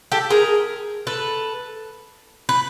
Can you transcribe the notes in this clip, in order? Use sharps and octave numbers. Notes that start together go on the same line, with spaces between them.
G4 A4
G#4 A#4
A4 B4
B4